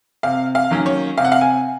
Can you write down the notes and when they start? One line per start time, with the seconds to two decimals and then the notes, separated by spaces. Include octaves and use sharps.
0.23 C3 F5
0.55 F5
0.71 D#3 F#3 A#3 C#4
0.86 C#5
1.18 C3 F5
1.25 F#5
1.32 F5
1.41 G#5